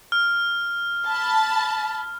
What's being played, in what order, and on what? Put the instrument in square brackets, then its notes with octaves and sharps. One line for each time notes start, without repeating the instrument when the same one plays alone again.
[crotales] F6
[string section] A5 B5